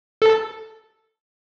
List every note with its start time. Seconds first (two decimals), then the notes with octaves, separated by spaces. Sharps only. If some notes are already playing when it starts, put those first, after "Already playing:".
0.22 A4